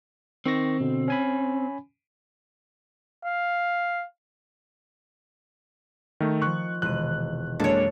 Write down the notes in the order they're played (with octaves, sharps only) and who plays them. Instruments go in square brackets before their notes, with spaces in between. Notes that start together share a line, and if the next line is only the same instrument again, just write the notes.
[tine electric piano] D#3 C#6 A#6 [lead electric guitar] C4
[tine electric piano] B2 D3
C#4 G#5 B5
[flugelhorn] F5
[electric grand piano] D#3 A3
[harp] D#3 F3 [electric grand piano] C#6 F#6
[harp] E1 C3 D#7 [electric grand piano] F#6
[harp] F#2 C7 [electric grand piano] G#3 A#3 D4 [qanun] A4 C#5